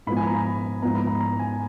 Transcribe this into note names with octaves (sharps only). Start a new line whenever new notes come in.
G#2 F3 B3 B5
G#5
A#5
B5
G#2 F3 B3 A#5
B5
A#5
A#5
G#5